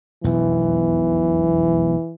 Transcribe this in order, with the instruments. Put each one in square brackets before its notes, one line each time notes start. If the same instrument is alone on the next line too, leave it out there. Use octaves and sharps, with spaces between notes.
[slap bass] E1 B1 F2 [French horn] E3